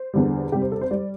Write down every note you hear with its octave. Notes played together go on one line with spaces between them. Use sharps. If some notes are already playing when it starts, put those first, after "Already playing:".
Already playing: C5
E2 D3 G3
C3 G3 G4
C5
A4
C5
G3 D5